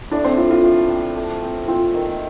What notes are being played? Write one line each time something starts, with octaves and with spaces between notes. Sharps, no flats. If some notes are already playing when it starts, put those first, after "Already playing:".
A2 D4 D5
C4 C5
A2 F4
F4
A2
C4
A3
C4
C4 F4
D#3